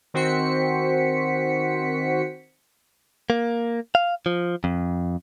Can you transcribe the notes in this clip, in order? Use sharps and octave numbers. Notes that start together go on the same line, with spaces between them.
D#3 C4 F#4 C5 B6 C#7
A#3
F5
F3
F2